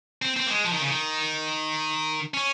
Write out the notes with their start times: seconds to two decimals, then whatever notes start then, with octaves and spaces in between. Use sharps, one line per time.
0.22 C4
0.36 C4
0.46 A#3
0.50 G#3
0.65 F3
0.73 D#3
0.81 C#3
0.88 D#3
2.34 C#4